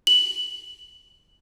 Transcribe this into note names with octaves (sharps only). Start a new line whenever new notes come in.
F#7